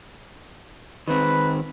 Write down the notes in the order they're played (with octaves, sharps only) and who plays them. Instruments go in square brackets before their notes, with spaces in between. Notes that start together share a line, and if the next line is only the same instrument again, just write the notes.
[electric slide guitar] D#3 C4 [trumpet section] B4